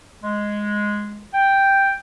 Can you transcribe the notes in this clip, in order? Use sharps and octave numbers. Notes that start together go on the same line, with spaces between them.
G#3
G5